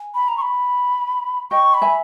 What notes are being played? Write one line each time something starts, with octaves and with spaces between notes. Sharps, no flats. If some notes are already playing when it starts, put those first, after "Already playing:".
Already playing: G#5
B5
A#5
C#6
B5
D#5 G5 C#6
B5
E5 G#5